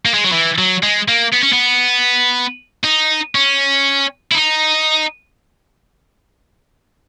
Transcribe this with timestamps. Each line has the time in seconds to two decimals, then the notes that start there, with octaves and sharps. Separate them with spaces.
0.06 A#3
0.14 G#3
0.24 F#3
0.32 E3
0.58 F#3
0.83 G#3
1.08 A#3
1.33 B3
1.43 C#4
1.53 B3
2.84 D#4
3.35 C#4
4.32 E4
4.35 D#4